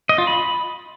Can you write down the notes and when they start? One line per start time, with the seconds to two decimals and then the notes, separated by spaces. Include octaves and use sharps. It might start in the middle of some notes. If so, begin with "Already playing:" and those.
0.09 D#5
0.18 F4
0.27 B5